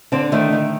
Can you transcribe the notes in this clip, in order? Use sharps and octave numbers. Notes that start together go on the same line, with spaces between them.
D3 C4
D#3 A3
D#3